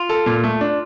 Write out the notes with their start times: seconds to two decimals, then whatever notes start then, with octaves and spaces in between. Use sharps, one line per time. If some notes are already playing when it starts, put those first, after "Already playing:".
Already playing: F4
0.09 A4
0.26 A#2
0.44 A3
0.61 D4